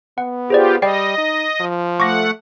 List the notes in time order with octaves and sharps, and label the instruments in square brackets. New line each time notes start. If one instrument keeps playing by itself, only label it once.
[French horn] B3 [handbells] F#5
[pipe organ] F4 G4 [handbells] G#4 C5 D5
[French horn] G3 [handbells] D5 G5 C7 [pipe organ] D#5
[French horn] D#4
F3
[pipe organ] A3 F#5 [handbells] C#6 D6 A#6